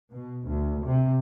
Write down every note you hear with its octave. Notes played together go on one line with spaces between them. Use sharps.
B2
D2
C3